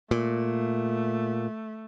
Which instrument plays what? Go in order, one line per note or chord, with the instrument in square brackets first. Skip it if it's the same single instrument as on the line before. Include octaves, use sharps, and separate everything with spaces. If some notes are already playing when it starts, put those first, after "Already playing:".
[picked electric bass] A#2 [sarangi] A3